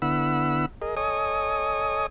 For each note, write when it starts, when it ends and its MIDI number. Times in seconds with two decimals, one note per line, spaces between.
0.02 0.66 50
0.02 0.66 59
0.02 0.66 64
0.02 0.66 78
0.02 0.66 83
0.02 0.66 88
0.82 0.95 68
0.82 0.95 70
0.82 0.95 75
0.97 2.06 69
0.97 2.06 73
0.97 2.06 75
0.97 2.06 80
0.97 2.06 87